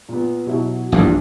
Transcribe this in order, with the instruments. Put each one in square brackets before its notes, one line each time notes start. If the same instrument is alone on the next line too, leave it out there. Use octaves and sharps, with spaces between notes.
[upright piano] A#2 B3
B2 F#3 E4
[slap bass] A#1 E2 G2 [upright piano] E3